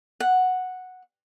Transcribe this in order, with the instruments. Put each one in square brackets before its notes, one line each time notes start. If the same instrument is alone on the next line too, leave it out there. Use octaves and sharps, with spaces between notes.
[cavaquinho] F#5